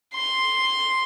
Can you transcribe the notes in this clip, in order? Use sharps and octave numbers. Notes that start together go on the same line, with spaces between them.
C6